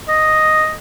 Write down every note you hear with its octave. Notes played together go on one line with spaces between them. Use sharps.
D#5